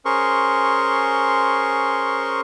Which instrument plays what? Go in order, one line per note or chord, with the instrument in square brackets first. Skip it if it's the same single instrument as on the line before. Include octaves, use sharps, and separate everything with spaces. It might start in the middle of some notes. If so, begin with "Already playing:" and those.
[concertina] C#4 G#4 A#4 C5 C6 C#6